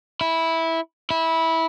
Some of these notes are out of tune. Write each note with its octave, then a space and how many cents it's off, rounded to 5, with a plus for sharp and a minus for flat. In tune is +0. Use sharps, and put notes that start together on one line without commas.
E4 -10
E4 -15